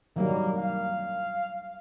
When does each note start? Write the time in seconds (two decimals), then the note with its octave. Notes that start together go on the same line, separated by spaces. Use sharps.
0.16 D#3 F#3 G3 A#3
0.58 F5